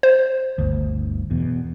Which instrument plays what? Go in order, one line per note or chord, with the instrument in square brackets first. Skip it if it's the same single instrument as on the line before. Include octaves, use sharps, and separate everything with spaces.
[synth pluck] C5
[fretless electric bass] G1 D2
E2 B2